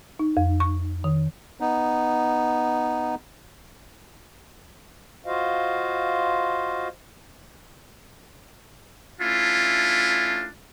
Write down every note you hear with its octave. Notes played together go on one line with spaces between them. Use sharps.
D#4
F2
C#6
D#3
B3 D#4
F4 F#4 C5 D#5 F5
A3 C#4 D4 E4 F4